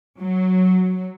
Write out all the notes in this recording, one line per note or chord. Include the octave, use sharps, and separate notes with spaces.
F#3